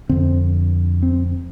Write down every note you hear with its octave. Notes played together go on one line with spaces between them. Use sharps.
F2 D3 C4
C4